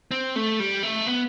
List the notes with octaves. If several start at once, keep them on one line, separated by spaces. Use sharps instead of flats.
C4
A3
G3
A3
B3